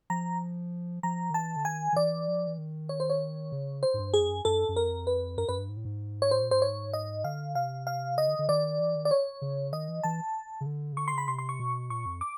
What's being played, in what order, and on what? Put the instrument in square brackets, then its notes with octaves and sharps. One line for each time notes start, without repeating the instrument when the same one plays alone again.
[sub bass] F3 [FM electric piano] A#5
[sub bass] F3 [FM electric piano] A#5
[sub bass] D#3
[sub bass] E3 [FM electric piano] A5
[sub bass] D3
[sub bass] D#3 [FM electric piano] G#5
[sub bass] D#3
[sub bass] E3 [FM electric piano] D5
[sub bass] F3
E3
D#3
[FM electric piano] C#5
C5
C#5
[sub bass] C#3
[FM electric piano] C5
[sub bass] G#2
G2
[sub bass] F#2 [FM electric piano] G#4
[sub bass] F2
F#2
[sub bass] F#2 [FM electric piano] A4
[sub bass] F#2
[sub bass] F2 [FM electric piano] A#4
[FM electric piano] B4
[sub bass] F#2 [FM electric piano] A#4
[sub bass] F#2 [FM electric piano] B4
[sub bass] G2
G#2
A2
G#2
[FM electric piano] C#5
[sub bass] A2 [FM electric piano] C5
[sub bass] A#2
[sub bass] G#2 [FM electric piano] C5
[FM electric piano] C#5
D#5
[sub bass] D3 [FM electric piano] F5
[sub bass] C3 [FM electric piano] F5
[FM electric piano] F5
[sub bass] C#3 [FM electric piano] D#5
[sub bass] D3
D3
[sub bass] D#3 [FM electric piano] D5
[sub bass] E3
D#3
[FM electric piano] D5
C#5
[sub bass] C#3
[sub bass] D#3 [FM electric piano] D#5
[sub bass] E3
[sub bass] E3 [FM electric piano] A5
[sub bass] C#3
D3
C#3
[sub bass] D3 [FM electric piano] C#6
[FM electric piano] C6
[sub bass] C#3
[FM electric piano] B5
[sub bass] C3 [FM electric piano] C6
[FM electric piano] C6
C#6
[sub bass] B2
[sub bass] A#2 [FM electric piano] C#6
[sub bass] F2
[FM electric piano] D6